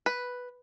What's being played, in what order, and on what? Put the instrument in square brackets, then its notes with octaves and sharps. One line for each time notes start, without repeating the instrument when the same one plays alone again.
[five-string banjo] B4